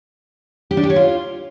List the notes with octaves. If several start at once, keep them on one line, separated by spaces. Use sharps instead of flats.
G4
D4
G4
C#5
F4